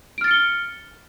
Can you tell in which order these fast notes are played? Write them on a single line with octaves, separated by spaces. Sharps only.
D7 F6 A6 C#7 G7